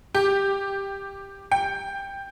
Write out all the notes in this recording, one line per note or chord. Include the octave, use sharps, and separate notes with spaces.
G4
G5